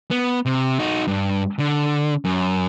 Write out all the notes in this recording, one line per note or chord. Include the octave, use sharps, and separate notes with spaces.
B3
C3
D#4 F#4
G2
D3
F#2